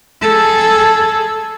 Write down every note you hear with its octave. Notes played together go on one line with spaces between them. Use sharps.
G#4 A4